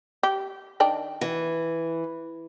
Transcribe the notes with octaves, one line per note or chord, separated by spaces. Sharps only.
G4
D#3 D4 G5
E3